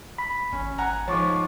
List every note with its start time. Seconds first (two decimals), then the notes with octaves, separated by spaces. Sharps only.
0.18 B5 B6
0.53 G#1 C#4
0.78 F#5 G#5 A#5
1.08 G#2 F3 C#5 C#6 D6